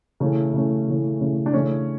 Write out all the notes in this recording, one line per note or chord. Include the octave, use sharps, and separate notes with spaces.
C#3 E3 A3 C#4
C#3 E3 A3 C#4
C#3 E3 A3 C#4
C#3 E3 A3 C#4
D4
C#3 E3 A3 C#4